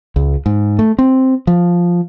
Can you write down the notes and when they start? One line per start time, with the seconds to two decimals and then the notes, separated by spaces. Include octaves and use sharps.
0.16 C#2
0.46 G#2
0.79 A3
0.99 C4
1.47 F3